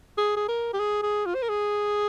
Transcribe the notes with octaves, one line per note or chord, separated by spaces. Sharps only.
G#4
G#4
A#4
G4
G#4
G#4
F4
C5
A#4
G#4